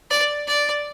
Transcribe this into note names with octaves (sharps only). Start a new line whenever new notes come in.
D5
D5